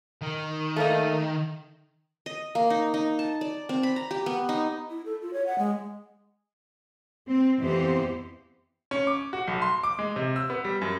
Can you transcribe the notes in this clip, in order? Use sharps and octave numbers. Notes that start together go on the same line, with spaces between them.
D#3
A3 A#3 D#4
D#5
A#3
D#4
D#4
A5
D5
C4
B5
A#5
G4
B3
D#4
E4
A4
F4
C#5
F#5
G#3
C4
F2 E3 B3 C4 G4 C5
C#4
D6
F#4
B1
C6
D6
G#3
C3
E6
B3
G3
F#2